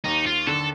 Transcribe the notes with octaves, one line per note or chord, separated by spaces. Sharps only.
D#2 D#4
F4
D3 A4